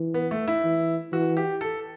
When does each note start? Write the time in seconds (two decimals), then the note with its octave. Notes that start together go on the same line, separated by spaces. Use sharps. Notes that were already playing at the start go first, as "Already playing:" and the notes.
Already playing: E3
0.14 B3
0.31 A3
0.48 E4
0.64 E3
1.12 E3 F#4
1.37 G4
1.61 A4